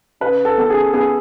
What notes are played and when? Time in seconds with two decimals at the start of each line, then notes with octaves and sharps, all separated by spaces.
0.20 C#3 B4
0.45 A4
0.58 B3 A4
0.70 G#4
0.93 B3 G#4